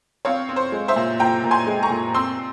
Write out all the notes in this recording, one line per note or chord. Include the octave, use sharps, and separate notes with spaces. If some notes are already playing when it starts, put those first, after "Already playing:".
C4 C#5 F5
C4
C5
G#3
C5 E5
A#2
A#2 G5 A#5
A#2
G#5 C6
G#3
A#5 C#6
A#2
C4 C6 E6